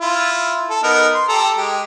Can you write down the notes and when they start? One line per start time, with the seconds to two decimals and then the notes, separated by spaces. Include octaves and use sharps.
0.01 E4 F4
0.70 A4
0.83 B3 D#4 A#4
1.14 C6
1.29 G4 A4 A#5
1.58 G#3 G4